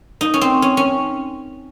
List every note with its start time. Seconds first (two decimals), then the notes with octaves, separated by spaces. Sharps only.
0.21 D#4
0.34 C#4
0.41 C4
0.62 C#4
0.77 C#4